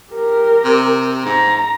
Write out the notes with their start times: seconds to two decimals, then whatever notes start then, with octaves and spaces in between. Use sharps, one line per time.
0.13 G4 A#4
0.64 C3
1.25 G#2 A#5